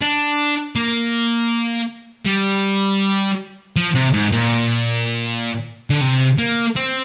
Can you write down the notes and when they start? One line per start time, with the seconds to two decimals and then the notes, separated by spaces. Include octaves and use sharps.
0.01 D4
0.76 A#3
2.25 G3
3.76 F3
3.95 C3
4.13 G#2
4.32 A#2
5.90 D3
6.01 C3
6.38 A#3
6.76 C4